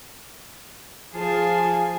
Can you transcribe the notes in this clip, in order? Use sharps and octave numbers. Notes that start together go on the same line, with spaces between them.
F3 F4 G#4 C5 G#5 A5